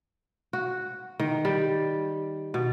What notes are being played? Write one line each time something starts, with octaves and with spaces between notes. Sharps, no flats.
F#4
D#3
G3
B2